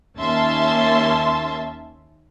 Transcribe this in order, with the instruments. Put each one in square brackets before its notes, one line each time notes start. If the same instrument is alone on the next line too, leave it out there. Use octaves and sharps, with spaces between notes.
[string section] D#2 A#3 C#4 E5 A5 C6